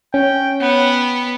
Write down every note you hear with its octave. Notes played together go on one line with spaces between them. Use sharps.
C#4 G5
B3 F#5 G5